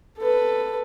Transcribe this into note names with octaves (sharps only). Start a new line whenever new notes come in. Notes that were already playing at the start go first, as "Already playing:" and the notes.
A4 B4